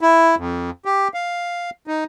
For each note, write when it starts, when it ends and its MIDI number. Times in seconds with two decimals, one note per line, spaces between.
0.01 0.35 64
0.37 0.70 41
0.85 1.08 67
1.14 1.70 77
1.87 2.04 63